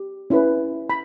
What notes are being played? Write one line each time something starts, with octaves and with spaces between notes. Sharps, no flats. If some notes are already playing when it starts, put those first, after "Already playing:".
Already playing: G4
C#4 E4 B4
B5